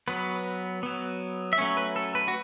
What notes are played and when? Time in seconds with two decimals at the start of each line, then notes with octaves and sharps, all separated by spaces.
0.08 F#3 B3 B4
0.83 F#3 B3
1.53 E5
1.58 F#3 A3 C#4 C#5
1.77 B4
1.96 A4
2.15 B4
2.28 F#4